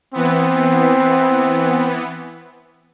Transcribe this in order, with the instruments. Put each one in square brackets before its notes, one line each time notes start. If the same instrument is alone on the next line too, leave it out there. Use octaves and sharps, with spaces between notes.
[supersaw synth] E3 B3 [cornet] C4